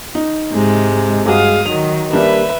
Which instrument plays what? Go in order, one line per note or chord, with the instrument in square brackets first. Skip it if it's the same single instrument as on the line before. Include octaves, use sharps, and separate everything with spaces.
[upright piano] D#4
[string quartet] G#2 C3 G#3
[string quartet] G2 F5 D#6 [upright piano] G#3 F#4 G#4
[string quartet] D#3 F#3 [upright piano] F7
[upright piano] G3 A#3 D4 [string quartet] B4 E5